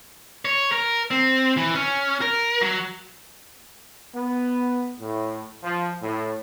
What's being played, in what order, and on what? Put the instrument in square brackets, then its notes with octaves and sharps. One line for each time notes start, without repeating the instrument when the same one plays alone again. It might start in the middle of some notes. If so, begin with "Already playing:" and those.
[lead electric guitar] C#5
A#4
C4
E3
C#4
A#4
F#3
[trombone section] B3
A2
F3
A2